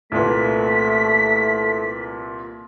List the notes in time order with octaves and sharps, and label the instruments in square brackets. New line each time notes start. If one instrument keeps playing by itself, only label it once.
[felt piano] C2 A#2 B4 [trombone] A3 [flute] B6